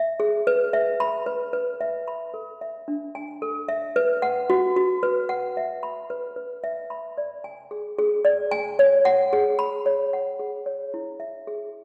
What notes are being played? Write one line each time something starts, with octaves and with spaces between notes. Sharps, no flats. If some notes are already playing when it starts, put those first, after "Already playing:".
Already playing: E5
G#4
B4
E5
B5
B4
B4
E5
B5
A4
E5
D4
G#5
A4
E5
B4
F#5
F#4
F#4
B4
F#5
E5
B5
B4
B4
E5
B5
D5
G#5
G#4
G#4
D5
G#5
C#5
F#5
G#4
B5
C#5
F#5
G#4
C#5
E4
E5
G#4